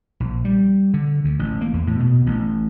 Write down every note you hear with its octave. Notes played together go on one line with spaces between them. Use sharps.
A#1
G3
D3
D2
A1
A#3
E2
A2
B2
A1